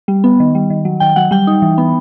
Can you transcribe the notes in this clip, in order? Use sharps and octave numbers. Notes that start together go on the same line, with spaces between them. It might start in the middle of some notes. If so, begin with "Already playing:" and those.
G3
B3
D#3
G3
D#3
F#3
D#3 G5
F#3 F#5
G3 G5
D#4
E3
B3